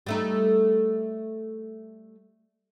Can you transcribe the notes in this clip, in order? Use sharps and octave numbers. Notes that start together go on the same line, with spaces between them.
G3 A3 D#4